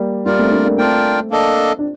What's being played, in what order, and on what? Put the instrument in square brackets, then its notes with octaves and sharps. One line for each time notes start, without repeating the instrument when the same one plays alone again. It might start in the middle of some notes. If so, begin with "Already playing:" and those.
Already playing: [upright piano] G3 A#3
[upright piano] G3 A#3 [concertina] F4 A#4 D5
[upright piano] A3 C4
A#3 D4
A#3 D4
[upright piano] A3 C4 [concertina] D4 F4 A#4 D5 G5
[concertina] A#3 D4 A4 D#5
[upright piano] D4